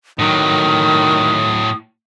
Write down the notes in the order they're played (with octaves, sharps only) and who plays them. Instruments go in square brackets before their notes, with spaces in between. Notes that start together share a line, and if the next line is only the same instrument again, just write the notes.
[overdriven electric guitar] A2 F#3 [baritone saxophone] D#3 [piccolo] D#6